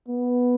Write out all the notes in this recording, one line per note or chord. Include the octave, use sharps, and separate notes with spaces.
B3